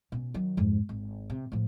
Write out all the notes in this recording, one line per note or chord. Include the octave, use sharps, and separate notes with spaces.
B2 C#4
D#3 F#3
F2 G#2
G#1
C3
A2 F3